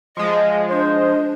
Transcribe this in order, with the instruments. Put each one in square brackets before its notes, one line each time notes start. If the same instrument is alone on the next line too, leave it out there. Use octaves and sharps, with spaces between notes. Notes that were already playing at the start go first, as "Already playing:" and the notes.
[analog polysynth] F3 G#3 [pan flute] D#5
[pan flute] D4 [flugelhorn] C5